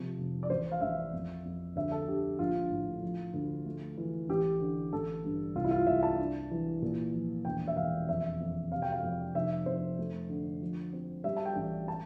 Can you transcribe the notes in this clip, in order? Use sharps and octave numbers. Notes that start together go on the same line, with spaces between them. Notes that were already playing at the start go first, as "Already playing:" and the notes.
Already playing: C3 F3
F1
D5
A1 C5
F5
A1 E5
F2
F2
D2 E5
A4
D3 G4
A#1 F4
A2
F3
D2
A3
E3
A1 G4
D3
A1 A4
G2
C2 F4
E4
F4
C2 E5
A5
D4
E3
A#2
F3
E1 G5
E5
E1 F5
F2 E5
F2
C3 F5
G5
F5
F2
F1 E5
F2 C5
A3
D3
F3
C4
G3 E5
A5
G5
A1
A5